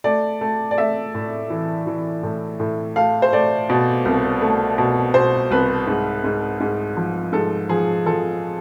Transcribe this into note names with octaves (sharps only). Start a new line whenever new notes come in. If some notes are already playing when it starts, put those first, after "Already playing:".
A3 D5
A3
D5
A3 E5
A2
E3
E3
A2
A2
A3 F5
C5
A3 D5
B2
C2
A3
B2
B2 C5
C2 B4
G#2
G#2
G#2
F3
G#2 A4
F3 G#4
F3 A4